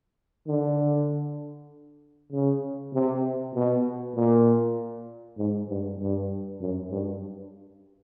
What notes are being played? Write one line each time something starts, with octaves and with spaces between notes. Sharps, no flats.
D3
C#3
C3
B2
A#2
G#2
G2
G2
F#2
G2